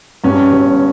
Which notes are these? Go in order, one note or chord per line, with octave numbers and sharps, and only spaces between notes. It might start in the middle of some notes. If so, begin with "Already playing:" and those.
G2 C#4
G1